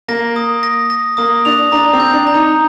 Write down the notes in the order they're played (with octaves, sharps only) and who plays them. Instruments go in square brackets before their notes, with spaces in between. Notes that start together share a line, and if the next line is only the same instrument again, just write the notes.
[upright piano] A#3 [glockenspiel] A#6
[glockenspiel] D#6
A#6
A#6
[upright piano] A#3 [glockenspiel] D#6
[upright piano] D4 [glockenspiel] F7
[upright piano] D4 [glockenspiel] A#5
[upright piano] C4
[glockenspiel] G6
[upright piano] D4
[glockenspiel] A#5
[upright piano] D#4